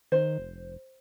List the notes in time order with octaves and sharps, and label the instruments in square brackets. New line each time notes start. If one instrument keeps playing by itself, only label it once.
[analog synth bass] D#3 [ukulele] C5
[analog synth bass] F1